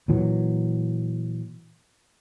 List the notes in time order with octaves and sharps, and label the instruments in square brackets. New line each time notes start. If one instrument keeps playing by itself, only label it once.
[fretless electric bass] A#2 E3 F#3